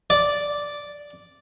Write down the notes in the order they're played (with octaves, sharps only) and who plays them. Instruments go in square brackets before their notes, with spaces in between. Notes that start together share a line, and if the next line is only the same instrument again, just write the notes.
[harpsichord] D5